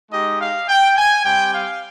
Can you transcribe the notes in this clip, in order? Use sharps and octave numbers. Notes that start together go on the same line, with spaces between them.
G#3 D#4 G4 D#5
F5
G5
G#5
G3 C4 G4 G5
F5